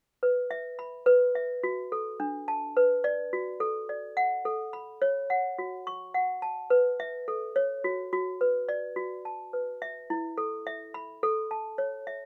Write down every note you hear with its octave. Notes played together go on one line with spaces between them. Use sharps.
B4
E5
B5
B4
E5
F#4
A4
D4
A5
B4
D5
F#4
A4
D5
F#5
A4
B5
C#5
F#5
F#4
C#6
F#5
A5
B4
E5
A4
C#5
F#4
F#4
B4
D5
F#4
A5
B4
E5
E4
A4
E5
B5
A4
A5
C#5
E5